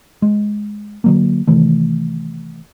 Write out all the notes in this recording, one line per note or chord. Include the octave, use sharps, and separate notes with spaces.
G#3
D3 F#3 A#3
C3 D#3 E3 A3